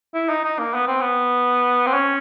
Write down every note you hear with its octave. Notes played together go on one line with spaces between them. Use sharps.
E4
D#4
D#4
A#3
B3
C4
B3
C4
C#4